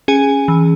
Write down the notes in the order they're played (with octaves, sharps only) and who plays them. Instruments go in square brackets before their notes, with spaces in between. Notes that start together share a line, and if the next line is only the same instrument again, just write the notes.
[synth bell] C#4 G#4 G#5
E3